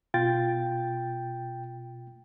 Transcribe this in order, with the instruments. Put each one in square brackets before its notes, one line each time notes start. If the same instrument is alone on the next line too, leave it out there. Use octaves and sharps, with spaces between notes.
[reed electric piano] B2 F4 A6 [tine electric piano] G5